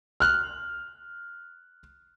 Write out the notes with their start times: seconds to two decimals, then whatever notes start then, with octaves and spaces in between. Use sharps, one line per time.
0.20 F6 F#6